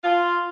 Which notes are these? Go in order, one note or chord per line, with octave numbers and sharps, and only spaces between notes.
F4